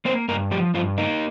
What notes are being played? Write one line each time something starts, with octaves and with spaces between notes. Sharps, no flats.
A#3 C4 C5
G2 A#3 A#4
F3 G3 G4
G2 F3 F4
A#3 D#4